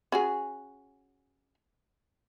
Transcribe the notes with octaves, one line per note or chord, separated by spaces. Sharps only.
C#4 F#4 G#4